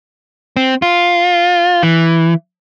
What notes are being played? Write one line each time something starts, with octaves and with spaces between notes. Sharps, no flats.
C4
F4
E3